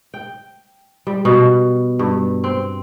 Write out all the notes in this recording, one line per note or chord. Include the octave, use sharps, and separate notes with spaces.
G5
G3
B2
G2
C4